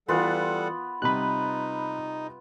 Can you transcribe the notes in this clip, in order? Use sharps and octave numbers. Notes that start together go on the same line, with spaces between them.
E3 G3 B3 F4 A4 B4 F#5
C3 G3 D#4 B5 F#6